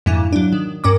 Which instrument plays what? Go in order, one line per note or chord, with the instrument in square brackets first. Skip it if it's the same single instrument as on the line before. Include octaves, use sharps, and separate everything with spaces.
[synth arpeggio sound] F2 G#2 D3 E4
F#3 D4
D#3
G2 C#4 A#4 D6